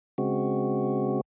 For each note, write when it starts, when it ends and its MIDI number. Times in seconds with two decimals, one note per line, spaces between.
0.18 1.21 49
0.18 1.21 56
0.18 1.21 60
0.18 1.21 66